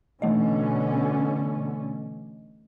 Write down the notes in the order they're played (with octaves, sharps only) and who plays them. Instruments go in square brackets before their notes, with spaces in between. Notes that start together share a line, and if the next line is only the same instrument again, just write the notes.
[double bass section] B2 D3 C#4 [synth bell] E3 A3 D#5